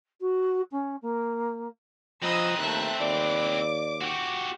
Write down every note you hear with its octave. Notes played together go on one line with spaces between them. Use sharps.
F#4
C#4
A#3
F3 C4 B4 D#5 A#5 D#6 E6
D#2 A3 E5 F#6
D#2 D5 D6
F#4 G4